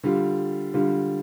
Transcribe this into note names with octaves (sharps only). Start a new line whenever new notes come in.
D3 G3 F4
D3 G3 F4